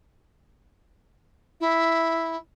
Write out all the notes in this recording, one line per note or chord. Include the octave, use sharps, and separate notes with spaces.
E4